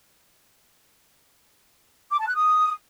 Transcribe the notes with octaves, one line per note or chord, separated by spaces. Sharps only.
D6
A5
F#6
D#6